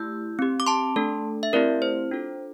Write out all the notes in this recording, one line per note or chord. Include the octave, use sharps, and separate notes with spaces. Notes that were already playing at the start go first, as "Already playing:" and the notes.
Already playing: A3 E4 G4 E6 G6
C4 G4
D6
A5 C6
A3 D4 A4
E5
A3 C4 E4 G4 A#4 D5
C5
D4 F4 A4